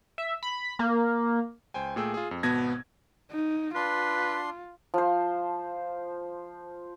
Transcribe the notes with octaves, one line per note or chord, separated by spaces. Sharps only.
E5
B5
A#3
C#2 C5 G5 G#5
A#2 A3 G#4 G5 E6
F4 G#4
F2
G#1 B2 B3 A5 G#6 A#6
D#4
D4 F4 B4 C6
F3 C5